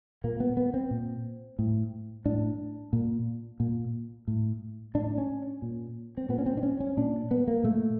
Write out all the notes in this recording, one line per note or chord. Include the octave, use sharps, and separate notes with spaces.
A#2 A#3
B3
B3
C4
A#2
A2
A2 D4
A#2
A#2
A2
A2 D4
C#4
A#2
C4
A#2 B3
C#4
C4
D4
C#4
C#4
A#2 D4
B3
A#3
A#2 A3